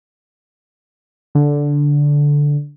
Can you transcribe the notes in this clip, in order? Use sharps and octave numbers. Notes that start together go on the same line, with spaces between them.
D3